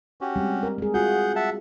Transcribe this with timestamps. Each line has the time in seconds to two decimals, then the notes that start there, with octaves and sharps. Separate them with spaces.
0.21 C#4 F#4 G4
0.36 G3 G#3 C4
0.63 A#4
0.78 G#3 G#4
0.94 F4 F#4 G#4 F#5 G6
1.36 E5 F#5 A5